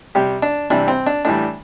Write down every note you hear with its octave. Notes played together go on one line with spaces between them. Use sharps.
C3 G3 G4
D4
C3 E3 G3 D4
C4
D4
A2 E3 G3 D4